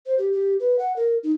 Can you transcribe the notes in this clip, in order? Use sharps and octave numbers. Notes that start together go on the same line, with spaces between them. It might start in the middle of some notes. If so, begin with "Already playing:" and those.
C5
G4
G4
B4
F#5
A#4
D#4